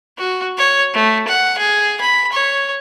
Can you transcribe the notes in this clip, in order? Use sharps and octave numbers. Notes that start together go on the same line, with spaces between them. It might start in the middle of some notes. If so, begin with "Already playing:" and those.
F#4
C#5
A3
F#5
G#4
B5
C#5